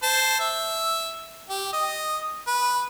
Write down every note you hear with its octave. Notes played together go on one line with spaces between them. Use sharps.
C5 A5
E5
G4
D#5
B4